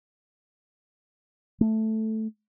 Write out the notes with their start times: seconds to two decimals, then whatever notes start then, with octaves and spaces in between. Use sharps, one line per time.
1.61 A3